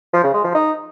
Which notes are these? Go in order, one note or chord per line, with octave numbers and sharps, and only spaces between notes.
F3
C#3
G#3
F3
D#4